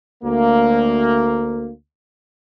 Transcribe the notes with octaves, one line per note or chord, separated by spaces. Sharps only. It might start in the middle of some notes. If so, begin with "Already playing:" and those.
D2 A#3